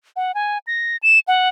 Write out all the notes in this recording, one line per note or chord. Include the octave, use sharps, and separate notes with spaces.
F#5
G#5
A#6
E7
F#5